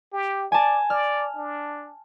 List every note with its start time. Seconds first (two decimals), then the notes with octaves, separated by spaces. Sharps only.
0.13 G4
0.52 D5 G#5 A5
0.90 D5 F6
1.36 D4